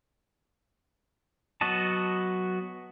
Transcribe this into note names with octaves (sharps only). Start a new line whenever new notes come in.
F#3 B3 F#4 D#5 A5